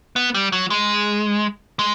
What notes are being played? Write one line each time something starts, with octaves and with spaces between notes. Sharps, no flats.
B3
G3
F#3
G#3
G#3